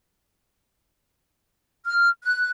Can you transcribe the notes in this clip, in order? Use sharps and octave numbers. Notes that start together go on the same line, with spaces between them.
F6
F#6